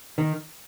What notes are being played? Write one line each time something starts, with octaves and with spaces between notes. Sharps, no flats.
D#3